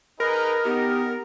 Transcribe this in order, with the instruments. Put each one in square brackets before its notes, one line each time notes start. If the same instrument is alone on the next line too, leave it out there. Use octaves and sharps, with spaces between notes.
[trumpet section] D#4 G#4 B4 [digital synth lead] A#4
[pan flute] B3 [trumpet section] D#4 [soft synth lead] G4